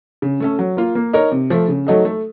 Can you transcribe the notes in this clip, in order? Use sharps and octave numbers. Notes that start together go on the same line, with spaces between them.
C#3
A3 C#4 A4
F#3
A#3 F4
A#3
D#4 A#4 C#5
C3
F3 A3
C#3
F#3 A3 D#4 A4
A3